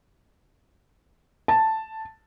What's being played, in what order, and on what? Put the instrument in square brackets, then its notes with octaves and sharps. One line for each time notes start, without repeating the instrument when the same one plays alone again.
[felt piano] A5